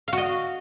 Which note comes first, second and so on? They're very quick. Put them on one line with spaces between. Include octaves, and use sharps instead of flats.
F5 F#4 D#5